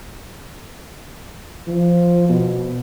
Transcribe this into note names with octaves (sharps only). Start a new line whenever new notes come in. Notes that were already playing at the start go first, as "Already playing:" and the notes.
F3
B2